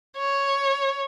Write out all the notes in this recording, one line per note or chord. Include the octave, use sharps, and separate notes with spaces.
C#5